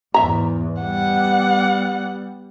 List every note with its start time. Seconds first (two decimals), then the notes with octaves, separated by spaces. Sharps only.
0.14 E2 G#2 E5 A#5
0.82 G3 B3 F#5